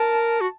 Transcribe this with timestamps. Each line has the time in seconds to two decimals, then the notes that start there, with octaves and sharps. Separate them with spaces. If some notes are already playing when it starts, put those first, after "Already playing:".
Already playing: A#4 A5
0.41 F#4